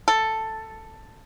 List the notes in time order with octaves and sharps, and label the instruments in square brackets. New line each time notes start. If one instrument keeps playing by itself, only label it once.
[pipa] A4